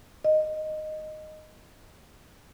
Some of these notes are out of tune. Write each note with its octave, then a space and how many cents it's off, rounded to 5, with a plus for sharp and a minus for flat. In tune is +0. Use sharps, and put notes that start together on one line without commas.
D#5 -10